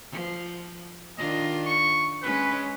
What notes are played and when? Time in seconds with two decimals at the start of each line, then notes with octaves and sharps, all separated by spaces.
0.12 F3
1.18 D#3 D4 F4 D#5
1.66 C#6
2.23 G#3 C#4 B4